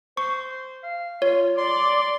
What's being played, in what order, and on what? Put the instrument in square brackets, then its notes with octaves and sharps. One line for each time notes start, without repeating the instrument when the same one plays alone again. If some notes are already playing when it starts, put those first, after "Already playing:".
[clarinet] C5 [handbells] C#6
[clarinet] F5
[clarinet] F4 [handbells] C#5
[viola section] D5 [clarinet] C6